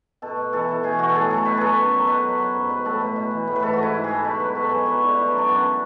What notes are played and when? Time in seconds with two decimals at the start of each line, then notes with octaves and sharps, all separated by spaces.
0.22 B2 A4
0.37 B2
0.53 E3 A4
0.68 E3 A4
0.83 B2 G#4
0.99 B2 F#4
1.09 A4
1.15 A2 G#4
1.30 F#3 A4
1.45 B2 B4
1.57 F#3 G#4 A4
1.76 F#2
1.93 F#3
2.00 A4
2.07 B2 B4
2.23 F#3
2.38 F#3
2.54 G#2
2.70 F#3 B4
2.85 A2 A4
3.01 B2 B4
3.16 B2
3.31 E3
3.48 A2
3.56 B4
3.63 G#2 A4
3.73 G#2 F#4
3.83 E4
3.94 G#2
4.04 G#2 G#4
4.14 A4
4.24 B2 B4
4.39 F#3 B4
4.55 G#2 A4
4.71 F#3 G#4
4.86 F#3 F#4
5.02 D3 E4
5.17 B2 E4
5.27 D4
5.32 F#3
5.38 D4
5.48 F#2 B3